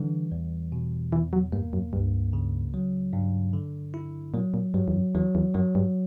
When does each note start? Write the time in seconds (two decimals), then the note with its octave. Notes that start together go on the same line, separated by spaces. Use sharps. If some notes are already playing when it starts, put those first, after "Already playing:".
Already playing: D3 E3 G3
0.32 E2
0.72 B2
1.12 E2 E3
1.33 F#3
1.52 G2 A#3
1.73 F#2
1.93 C#2 G2
2.33 C#3
2.74 F#3
3.13 G2
3.53 D3
3.94 E4
4.34 A#2 F#3
4.54 A#2
4.74 G2 F#3
4.88 E2
4.95 F#2
5.15 E2 F#3
5.35 E2
5.54 F#2 F#3
5.75 G2